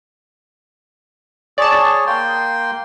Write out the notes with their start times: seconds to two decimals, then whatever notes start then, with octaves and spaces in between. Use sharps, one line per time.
1.58 G#4 C#5 D5 A5
2.07 A#3 G5 C6